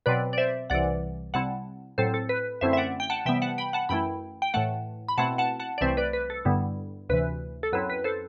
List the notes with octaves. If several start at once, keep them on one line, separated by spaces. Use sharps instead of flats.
B2 F#3 C4 B4 D5
D5
C5 E5
C2 C3 E3 D5 F#5
C3 G3 C4 E4 F#5 A5
A2 F#3 C4 A4 C5
A4
B4
F#2 D3 A3 C4 E4 C5 E5
E5
D5 F#5
G5
F#5 A5
C3 E3 G3 B3 E5 G5
F#5 A5
G5 B5
F#5 A5
F#2 E3 A3 E4 G5 B5
G5
A2 E3 A3 F#5 A5
B5
B2 A3 C4 E4 F#5 A5
F#5 A5
F#5 A5
D5
C2 C3 E3 A3 C4 C5 E5
B4 D5
B4
A4
G2 D3 G3 B3 E4
D2 C3 E3 B4
A4
F#2 F#3 C4 E4 B4
B4
A4 C5